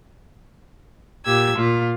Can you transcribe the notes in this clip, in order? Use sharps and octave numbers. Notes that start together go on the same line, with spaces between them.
A#2 G4 E6 G#6
A#2 F4